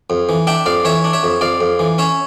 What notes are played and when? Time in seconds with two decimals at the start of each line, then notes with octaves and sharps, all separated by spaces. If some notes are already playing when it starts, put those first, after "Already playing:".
0.10 F2
0.29 E3
0.47 D4 E5 G5
0.66 F2 D5 F5
0.85 E3 C#5 E5
1.04 D4
1.13 C#5 E5
1.23 F2
1.41 F2 D5 F5
1.61 F2
1.79 E3
1.98 C#4 C#5 E5